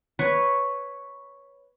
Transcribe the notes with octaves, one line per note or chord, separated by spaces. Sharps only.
B4 C#5